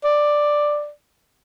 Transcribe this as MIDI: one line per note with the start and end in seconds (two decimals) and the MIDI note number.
0.04 0.89 74